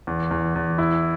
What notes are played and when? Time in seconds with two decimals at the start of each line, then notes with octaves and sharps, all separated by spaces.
0.07 E2
0.31 E2
0.55 E2
0.78 E4